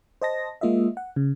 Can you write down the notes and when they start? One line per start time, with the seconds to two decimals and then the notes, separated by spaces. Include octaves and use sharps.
0.22 C5 D#5 A5 A#6
0.61 G#3 A#3 F4 D#5 E5
0.97 F#5
1.16 C#3